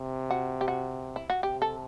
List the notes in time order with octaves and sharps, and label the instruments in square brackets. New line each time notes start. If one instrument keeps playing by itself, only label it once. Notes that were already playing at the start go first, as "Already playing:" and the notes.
Already playing: [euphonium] C3
[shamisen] F#4
G4
F#4
E4
F#4
[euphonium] C3 [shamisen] G4
[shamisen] A4